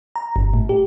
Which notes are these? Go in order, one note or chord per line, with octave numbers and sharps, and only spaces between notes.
A#5
G1
A2
G4